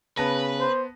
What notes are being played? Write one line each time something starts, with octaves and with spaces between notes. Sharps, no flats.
C#3 B3 B4 A5 A#6
C5